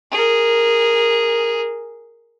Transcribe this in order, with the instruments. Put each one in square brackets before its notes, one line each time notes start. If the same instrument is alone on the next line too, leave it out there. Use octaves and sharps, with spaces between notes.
[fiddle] G#4 A#4